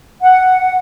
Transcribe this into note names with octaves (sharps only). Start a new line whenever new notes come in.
F#5